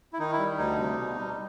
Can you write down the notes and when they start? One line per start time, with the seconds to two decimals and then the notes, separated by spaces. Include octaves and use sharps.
0.13 E4
0.19 D#3 D#4
0.32 E4
0.39 G3
0.58 D2 D#4
0.78 C3
0.99 B2
1.17 G3